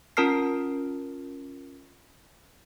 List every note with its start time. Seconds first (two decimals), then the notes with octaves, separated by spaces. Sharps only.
0.17 C#4 F4 A#4 A5 F6 C7